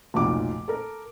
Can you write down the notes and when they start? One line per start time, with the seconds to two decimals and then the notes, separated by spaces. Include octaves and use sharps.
0.14 F1 B1 A#2 D6
0.68 A4 A#4